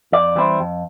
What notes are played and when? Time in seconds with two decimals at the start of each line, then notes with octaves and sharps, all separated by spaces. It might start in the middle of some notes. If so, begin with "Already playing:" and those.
0.12 F2 D5
0.35 E3 G3 C4 E4
0.59 F2